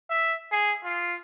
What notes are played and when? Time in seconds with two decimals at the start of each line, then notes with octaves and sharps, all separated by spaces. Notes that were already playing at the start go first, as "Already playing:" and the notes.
0.10 E5
0.52 G#4
0.84 F4